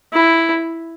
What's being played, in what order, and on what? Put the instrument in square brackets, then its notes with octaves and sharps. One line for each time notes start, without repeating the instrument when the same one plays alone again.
[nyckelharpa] E4